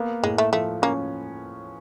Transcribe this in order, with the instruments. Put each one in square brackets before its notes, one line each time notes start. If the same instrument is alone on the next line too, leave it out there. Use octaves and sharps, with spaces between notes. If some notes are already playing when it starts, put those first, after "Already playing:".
Already playing: [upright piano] A#3 B3
[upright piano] A2 [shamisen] G#3
[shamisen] A3
[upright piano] F3 [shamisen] A3
[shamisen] A#3 [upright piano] C#4